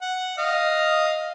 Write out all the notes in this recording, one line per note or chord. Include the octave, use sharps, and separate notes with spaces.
F#5
D#5 F5